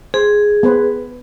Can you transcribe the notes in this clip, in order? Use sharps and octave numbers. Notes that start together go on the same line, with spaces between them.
G#4 C5
B3 B4 C5